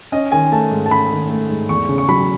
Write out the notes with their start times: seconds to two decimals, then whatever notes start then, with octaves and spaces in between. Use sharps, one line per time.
0.12 C#4 D#5
0.32 D#3 G#5
0.52 A3 A5
0.71 G#2
0.86 A5
0.91 C#4 B5
1.11 D#3
1.30 A3
1.49 G#2
1.69 E2 C#6
1.89 C#3
1.98 C#6
2.08 F#3 B5